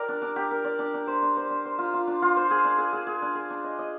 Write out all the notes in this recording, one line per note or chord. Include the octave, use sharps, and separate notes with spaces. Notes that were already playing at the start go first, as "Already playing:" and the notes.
Already playing: G4 A#4 D5
D4
D4
G4
A#4
D5
D4
D4
C5
D4
C5
D4
C5
F4
F4
D4
F4
C5
G#4
D4
G#4
G#4
G#4
D4
G#4
D4
D#5
D#5